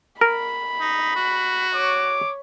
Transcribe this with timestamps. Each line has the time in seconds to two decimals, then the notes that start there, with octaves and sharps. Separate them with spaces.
0.21 A#4 B5
0.80 D#4
1.16 F#4
1.75 C#5 D6